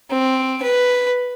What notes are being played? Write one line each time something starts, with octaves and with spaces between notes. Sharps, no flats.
C4
B4